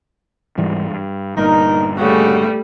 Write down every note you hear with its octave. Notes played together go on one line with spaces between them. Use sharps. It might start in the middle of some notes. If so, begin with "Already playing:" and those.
G#2 E3 G3
G2
G1 G2 A#2 D#4 A#4
C#3 G3 A3 F#4